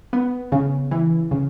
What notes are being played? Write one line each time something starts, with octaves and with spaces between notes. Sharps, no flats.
B3
C#3
E3
C#3